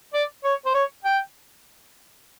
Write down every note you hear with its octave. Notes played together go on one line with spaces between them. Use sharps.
D5
C#5
C5
C#5
G5